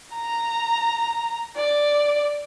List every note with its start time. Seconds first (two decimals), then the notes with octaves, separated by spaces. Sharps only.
0.14 A#5
1.56 D5